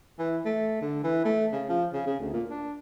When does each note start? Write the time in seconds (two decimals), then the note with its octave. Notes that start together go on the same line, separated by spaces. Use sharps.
0.19 E3
0.45 A3
0.81 D3
1.04 E3
1.25 A3
1.52 C#3
1.69 F3
1.93 C#3
2.07 C#3
2.20 D2
2.33 A#2
2.50 D4